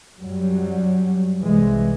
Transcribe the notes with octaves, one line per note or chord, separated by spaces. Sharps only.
F#2 F#3 G3
C2 E3 G#3